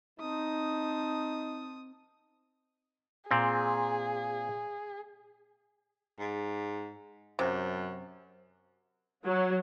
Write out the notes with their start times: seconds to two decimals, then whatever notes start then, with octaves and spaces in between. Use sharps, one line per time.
0.20 C4 D#4 A5 D#6
3.31 A#2 C4 G#4
6.19 G#2
7.39 F#2 C3
9.25 F#3